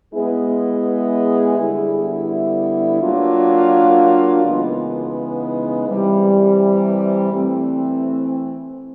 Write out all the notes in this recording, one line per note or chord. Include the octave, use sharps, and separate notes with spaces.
G#3 B3 E4 G#4
D3 G3 B3 E4
F#3 A#3 D4 F4
C#3 E3 G#3 B3 D#4
C3 E3 G3
E3 A3 C4